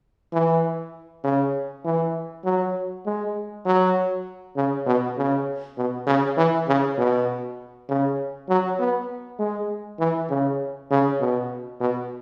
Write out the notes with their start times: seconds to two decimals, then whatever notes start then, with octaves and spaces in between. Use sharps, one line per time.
0.33 E3
1.24 C#3
1.85 E3
2.45 F#3
3.06 G#3
3.66 F#3
4.56 C#3
4.86 B2
5.17 C#3
5.77 B2
6.07 C#3
6.37 E3
6.68 C#3
6.98 B2
7.89 C#3
8.49 F#3
8.79 B3
9.39 G#3
9.99 E3
10.30 C#3
10.91 C#3
11.20 B2
11.80 B2